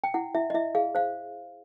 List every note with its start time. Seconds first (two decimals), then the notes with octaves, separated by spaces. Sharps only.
0.04 G5
0.14 E4 F#5
0.35 E4 E5
0.50 D#5
0.55 E4 E5
0.75 G#4 F5
0.95 C5 F5